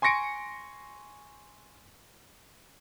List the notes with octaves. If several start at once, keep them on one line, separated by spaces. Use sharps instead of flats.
G#5 C6 C#6 A#6 C#7 D7